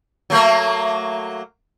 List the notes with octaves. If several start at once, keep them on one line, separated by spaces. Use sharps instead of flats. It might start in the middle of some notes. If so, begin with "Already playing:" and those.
F#3 A3 A#3